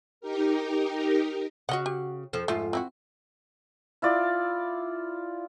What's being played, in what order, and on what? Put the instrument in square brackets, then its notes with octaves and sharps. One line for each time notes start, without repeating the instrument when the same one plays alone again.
[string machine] D#4 G4 A#4
[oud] C#3 F#4 [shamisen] D#5 F#5
[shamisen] G4
[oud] F2 F3 A4
[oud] F2 G#2 F4 [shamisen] A3
[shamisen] C4 E4 F#4
[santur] E4 F4 D5